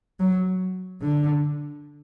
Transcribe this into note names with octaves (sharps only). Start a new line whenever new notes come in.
F#3
D3